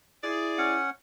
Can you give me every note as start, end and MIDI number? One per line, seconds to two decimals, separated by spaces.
0.24 0.79 64
0.24 0.81 68
0.24 0.81 74
0.58 0.90 61
0.58 0.90 78